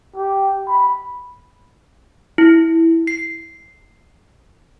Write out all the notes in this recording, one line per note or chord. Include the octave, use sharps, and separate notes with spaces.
G4
B5
E4
C7